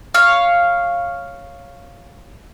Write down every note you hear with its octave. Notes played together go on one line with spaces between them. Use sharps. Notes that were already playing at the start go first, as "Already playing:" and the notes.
C#5 F5